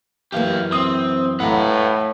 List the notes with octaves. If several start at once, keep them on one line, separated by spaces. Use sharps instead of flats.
F#2 E3 A#3 G4 F5
C4 D#6
A2 B4 F5 F#5 A#5